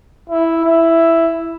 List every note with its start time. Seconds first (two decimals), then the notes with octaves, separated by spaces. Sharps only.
0.29 E4
0.64 E4